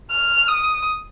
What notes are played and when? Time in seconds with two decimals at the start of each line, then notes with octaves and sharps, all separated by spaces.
0.12 F6
0.48 D#6